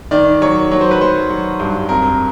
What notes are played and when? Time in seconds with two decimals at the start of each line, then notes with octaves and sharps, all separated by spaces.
0.11 D#3 D5
0.42 F#3 C#5
0.72 F#3 C#5
0.81 C5
0.91 B4
1.00 F#3 C5
1.30 F#3
1.60 G2
1.89 F2 A#4